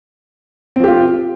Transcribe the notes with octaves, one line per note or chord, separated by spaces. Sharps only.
F3 C4 F4 G4